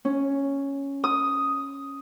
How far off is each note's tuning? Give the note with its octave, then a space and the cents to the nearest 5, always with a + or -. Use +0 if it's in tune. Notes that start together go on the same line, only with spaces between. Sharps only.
C#4 +0
D#6 +5